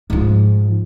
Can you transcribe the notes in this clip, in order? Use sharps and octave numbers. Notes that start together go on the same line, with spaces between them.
G#2 F3